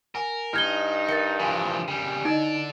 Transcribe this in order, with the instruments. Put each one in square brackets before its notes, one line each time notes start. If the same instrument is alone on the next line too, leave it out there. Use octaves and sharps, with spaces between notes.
[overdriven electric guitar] A#4 [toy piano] F#5 G#5
[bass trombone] G2 [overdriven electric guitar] D#4 [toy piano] E4 [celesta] F6 G#6 G7
[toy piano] A#4 E5 F#5 [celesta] A6 C#7
[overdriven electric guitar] E3 F3 [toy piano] F5 G#5
[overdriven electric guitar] C#3 G3 [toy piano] G5
[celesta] D#4 [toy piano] E4 D#5 [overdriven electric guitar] A4 D5